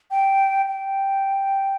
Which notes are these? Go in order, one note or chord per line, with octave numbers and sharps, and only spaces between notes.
G5
G5